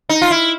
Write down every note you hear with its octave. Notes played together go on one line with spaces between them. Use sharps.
D#4
F4
E4